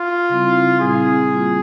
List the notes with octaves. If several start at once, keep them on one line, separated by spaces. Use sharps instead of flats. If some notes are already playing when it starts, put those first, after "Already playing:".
Already playing: F4
C#3 G3 C4 E4
A#2 G3 C4 E4 G#4
G3 A#3 F4